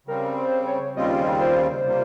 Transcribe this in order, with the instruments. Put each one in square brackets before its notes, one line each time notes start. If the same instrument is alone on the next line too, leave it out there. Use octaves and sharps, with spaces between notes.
[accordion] C#3 G3 C4 [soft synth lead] A#4
[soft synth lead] C5
C#5
[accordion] D#2 C#3 G3 C4 F4 [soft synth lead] D#5
[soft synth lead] C5
[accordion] C3 G3 A#3 F4